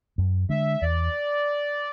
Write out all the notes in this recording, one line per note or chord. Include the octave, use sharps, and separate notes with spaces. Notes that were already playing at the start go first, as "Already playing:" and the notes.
F#2
D3 G#3 D4 E5
E2 D5